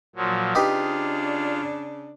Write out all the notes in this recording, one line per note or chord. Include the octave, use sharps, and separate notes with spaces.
A#2 F3 F#3
C#3 D4 D#4 F4 G4 B4